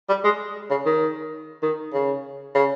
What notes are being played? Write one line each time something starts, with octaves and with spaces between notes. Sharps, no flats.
G3
G#3
C#3
D#3
D#3
C#3
C#3